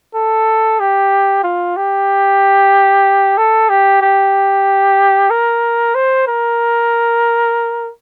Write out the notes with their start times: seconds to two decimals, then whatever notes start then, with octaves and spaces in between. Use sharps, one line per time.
0.15 A4
0.80 G4
1.44 F4
1.76 G4
3.38 A4
3.69 G4
4.01 G4
5.30 A#4
5.95 C5
6.27 A#4